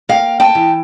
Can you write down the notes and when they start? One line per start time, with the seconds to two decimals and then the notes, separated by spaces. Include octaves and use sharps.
0.09 A#3 F5 G5
0.40 G5 A5
0.55 E3